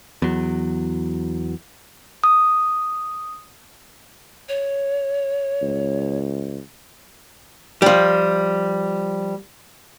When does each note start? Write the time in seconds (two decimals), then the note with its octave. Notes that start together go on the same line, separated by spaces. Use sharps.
0.22 E2 F#3
2.24 D#6
4.49 C#5
5.62 C#2
7.82 F3 G3